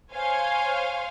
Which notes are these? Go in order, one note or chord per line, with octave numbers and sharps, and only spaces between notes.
C5 C#5 F5 G#5